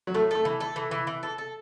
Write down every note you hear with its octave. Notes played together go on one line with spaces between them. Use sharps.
F#3
A2 A3
A3 A4
E3
A4
E3
E3
E3
A4
A4